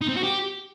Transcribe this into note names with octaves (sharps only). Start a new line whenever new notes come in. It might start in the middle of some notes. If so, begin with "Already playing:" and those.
D#4
C4
F#4
G4